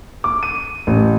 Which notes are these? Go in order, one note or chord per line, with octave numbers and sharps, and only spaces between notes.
D6
D#7
A1